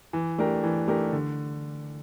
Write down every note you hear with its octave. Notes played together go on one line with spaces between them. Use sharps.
E3
A3 D4 G4 A#4
E3
A3 D4 G4 A#4
D3